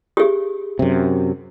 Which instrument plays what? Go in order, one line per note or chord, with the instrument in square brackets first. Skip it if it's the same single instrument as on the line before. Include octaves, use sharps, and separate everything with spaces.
[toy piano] G4 G#4
[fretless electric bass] F#2 C3